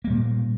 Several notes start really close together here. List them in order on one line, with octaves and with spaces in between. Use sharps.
A#3 G3 A#2